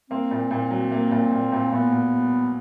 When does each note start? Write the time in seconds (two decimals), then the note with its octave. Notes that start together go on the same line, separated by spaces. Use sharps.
0.10 A#3 C4
0.31 A#2
0.51 A#2
0.71 F#3
0.91 A#3
1.11 A#2
1.32 A#2
1.52 A#2
1.72 A#2 B3
1.92 A#2